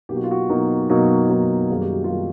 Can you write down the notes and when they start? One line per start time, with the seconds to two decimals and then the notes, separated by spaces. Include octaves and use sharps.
0.09 B2 F#3 A#3 D#4 G4
0.16 F#4
0.24 F4
0.31 F#4
0.49 B2 F#3 A#3 D#4
0.90 B2 F#3 A#3 D#4
1.29 B2 F#3 A#3 D#4
1.70 F#2 D#3 G3 A#3 G#4
1.81 G4
1.93 F#4
2.04 F4 G4
2.10 D#3 G3 A#3